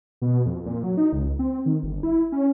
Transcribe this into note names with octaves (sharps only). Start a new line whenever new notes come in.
B2
F2
A#2
F#3
D#4
C#2
C4
D#3
G1
E4
C#4